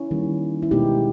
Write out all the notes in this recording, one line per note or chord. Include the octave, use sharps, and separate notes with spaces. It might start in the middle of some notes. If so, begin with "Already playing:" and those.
Already playing: C#4 E4
D#3 G3 A#3
E4
B2 G#3 B3 D#4 G4